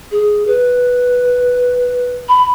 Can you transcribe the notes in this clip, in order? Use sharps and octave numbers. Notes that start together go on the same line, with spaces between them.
G#4
B4
B5